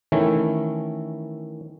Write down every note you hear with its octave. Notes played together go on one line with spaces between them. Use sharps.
D#3 E3 A3 C#4 E4